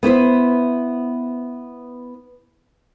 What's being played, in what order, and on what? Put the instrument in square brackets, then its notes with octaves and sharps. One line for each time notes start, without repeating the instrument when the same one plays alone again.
[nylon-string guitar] B3 E4 B4 C5